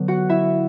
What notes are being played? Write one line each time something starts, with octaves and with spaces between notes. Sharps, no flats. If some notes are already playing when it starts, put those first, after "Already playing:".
Already playing: D3 F#3 B3
F#4 F#5
E4 E5